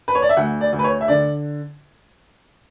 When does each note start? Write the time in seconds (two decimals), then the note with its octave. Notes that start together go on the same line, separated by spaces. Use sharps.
0.08 B4
0.15 C#5
0.22 D5
0.29 E5
0.37 D2 F#5
0.61 D5
0.73 D2
0.79 B4
0.84 C#5
1.01 E5
1.08 D3 D5